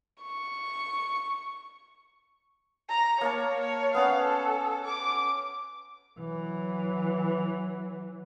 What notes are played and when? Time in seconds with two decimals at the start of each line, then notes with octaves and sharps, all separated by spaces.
0.23 C#6
2.89 A#5
3.21 A#3 C#5 F5 A5
3.60 C#5
3.94 B3 C#4 F5 F#5
4.24 A4
4.86 D6
6.19 E3 F#3